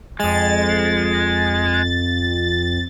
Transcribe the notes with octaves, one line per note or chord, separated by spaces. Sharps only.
F2 G#3 A6